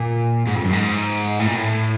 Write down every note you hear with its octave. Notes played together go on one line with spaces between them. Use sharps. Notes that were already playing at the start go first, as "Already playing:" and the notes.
Already playing: A#2
G#2
F2
F#2
G#2
A2
A#2
A2